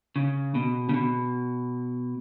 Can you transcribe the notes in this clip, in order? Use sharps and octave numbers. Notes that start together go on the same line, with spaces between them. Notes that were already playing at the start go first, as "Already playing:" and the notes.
C#3
B2
C#3
B2